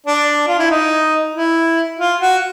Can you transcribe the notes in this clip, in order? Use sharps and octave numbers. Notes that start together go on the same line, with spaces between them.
D4
F4
E4
D#4
E4
F4
F#4